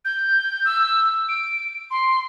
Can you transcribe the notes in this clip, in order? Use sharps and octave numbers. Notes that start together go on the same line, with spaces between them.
G6
E6
D7
C6